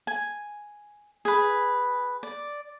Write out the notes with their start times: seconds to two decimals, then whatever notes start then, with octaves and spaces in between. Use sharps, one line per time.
0.07 G#5
1.25 G#4 B4
2.23 D5